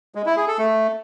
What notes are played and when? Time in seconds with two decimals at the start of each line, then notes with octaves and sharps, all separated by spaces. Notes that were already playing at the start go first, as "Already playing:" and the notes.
0.15 G#3
0.26 E4
0.37 G#4
0.48 A4
0.58 A3